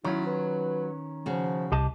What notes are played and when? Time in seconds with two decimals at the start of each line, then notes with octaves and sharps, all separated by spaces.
0.05 D#3 F#3 C#4 E4 F4
0.27 B4
1.26 C#3 F3 F#4
1.72 C2 G4 D#5 A5